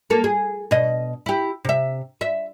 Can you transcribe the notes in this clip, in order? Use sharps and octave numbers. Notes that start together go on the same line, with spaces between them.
A#3 A4
G#4
B2 D#5
E4 G4
C3 E5
E5